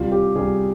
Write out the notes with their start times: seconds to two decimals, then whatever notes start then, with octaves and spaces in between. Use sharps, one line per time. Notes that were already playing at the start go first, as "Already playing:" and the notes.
Already playing: C2 F4
0.12 G4
0.35 C2 G#4